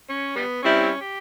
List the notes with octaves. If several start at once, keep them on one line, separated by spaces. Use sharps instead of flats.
C#4
G3 B3
G3 C4 C#4 E4
G4